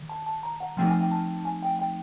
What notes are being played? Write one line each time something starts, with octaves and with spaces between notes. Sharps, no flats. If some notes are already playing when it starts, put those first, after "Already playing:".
Already playing: D#3
A5
A5
A#5
F#5
F3 A3 C4 D#4 G5
G#5
G5
A5
G#5
G5
G5